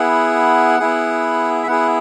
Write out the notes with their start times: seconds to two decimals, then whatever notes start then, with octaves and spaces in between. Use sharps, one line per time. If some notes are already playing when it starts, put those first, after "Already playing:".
Already playing: B3 E4 G#4 F#5
0.80 B3 E4 G#4
1.63 E5
1.67 B3 E4 G#4 F#5